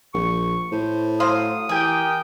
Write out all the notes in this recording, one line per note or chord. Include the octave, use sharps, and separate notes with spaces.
A#1 C#6
A2 C5
F#3 C5 F5 D#6
E3 G4 G#4 A#4 G5